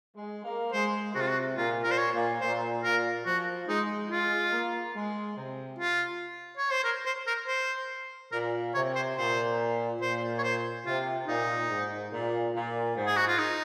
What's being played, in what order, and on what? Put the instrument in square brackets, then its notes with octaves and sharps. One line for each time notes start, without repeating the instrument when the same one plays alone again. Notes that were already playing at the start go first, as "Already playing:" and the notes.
[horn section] G#3
A#3
[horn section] G#3 [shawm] C5
[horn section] C3 [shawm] F#4
[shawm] F4
F#4
[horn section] A#2 [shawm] F4
[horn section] A#2 [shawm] A#4
[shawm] C5
C#5
[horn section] A#2
[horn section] A#2 [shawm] C5
[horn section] A#2 [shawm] A#4
[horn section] F3 [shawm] F#4
[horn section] G#3 [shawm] D#4
[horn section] G#3 [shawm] F4
[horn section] A#3
G#3
C3
[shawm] F4
C#5
C5
A#4
C5
A#4
C5
[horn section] A#2 [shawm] A#4
[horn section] C3 [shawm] C#5
[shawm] C5
[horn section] A#2 [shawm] C5
[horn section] A#2 [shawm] C5
[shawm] C#5
C5
[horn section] C3 [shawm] F4
[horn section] A#2 [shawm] D#4
[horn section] G#2
A#2
A#2
G#2
[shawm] G#4
F#4
F4
D#4